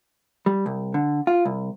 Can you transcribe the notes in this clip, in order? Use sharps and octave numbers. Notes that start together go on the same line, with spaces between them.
G3
C2
D3
F4
C2